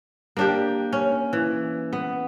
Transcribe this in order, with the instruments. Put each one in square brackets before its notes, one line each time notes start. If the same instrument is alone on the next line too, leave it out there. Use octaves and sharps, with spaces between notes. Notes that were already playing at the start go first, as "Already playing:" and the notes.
[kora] A#3 D4 G4
C#4
E3
B3